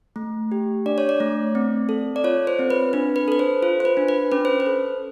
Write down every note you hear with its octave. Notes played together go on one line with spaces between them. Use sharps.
A3
G4
D4 D5
C#5
D5
A3
C4
A4
D5
F4 C#5
C5
C4
B4
D4 B4
B4
A4 B4
C5
F4 C5
C5
B4
D4
B4
C#4 B4
C5
B4
A4